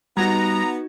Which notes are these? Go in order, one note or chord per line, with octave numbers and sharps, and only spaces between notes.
G3 B3 D#4 F#4 A#5 G#6